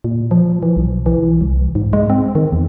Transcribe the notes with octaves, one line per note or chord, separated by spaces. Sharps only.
A#2
F3
E3
B1
E3
C2
G#2
G#3
C4
D#3
E2